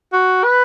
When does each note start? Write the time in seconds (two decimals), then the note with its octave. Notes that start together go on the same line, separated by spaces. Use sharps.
0.13 F#4
0.44 B4